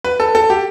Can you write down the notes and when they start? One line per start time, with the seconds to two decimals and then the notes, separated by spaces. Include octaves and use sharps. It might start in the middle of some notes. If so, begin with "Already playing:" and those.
0.04 B4
0.20 A4
0.35 A4
0.50 G4